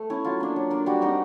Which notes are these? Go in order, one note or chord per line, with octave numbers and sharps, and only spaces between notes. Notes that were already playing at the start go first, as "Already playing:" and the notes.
Already playing: A3
C#4 E4
F#3 F4
A#3 D4
F#3
A#3 D4
G3 F#4
C4 D#4 F#4